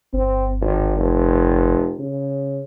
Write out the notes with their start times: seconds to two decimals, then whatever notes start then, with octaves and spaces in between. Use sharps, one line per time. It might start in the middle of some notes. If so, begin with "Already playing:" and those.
0.13 G1 C4
0.61 G#1
0.98 F1
1.99 C#3